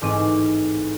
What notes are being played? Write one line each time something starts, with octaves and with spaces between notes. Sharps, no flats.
A1 G#2 C4 D6 D#7